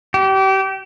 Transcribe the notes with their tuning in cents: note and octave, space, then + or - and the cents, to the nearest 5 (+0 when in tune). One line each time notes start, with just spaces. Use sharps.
G4 -30